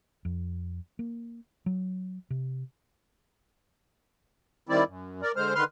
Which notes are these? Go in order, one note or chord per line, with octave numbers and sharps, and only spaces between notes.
F2
A#3
F#3
C3
D#3 G3 C4 E4 D5
F#2
A#4 D5
D3 G#3 C5 F6
D3 D#3 B4 C6 F6